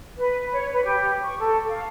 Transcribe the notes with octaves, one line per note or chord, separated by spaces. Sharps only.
B4
C#5
B4
G4
C#6
A4
F5